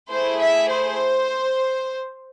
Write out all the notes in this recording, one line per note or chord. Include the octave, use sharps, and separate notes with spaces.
A3 E4 G#4 C5
E5
C5